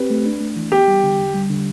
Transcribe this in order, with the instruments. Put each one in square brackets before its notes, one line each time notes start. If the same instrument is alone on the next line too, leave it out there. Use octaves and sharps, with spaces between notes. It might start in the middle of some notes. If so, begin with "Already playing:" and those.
Already playing: [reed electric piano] C4 G4 [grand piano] B4
[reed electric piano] A3
D4
A3
E3
[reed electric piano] B3 [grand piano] G4
[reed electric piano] G3
D3
E2
G3
D3